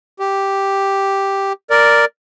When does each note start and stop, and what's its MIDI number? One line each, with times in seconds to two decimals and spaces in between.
0.20 1.53 67
1.70 2.05 70
1.70 2.05 74